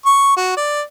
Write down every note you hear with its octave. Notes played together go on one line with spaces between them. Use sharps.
C#6
F#4
D5